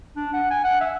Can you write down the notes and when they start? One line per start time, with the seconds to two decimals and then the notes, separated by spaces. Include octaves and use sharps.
0.17 D4
0.34 F#5
0.51 G#5
0.64 F#5
0.81 E5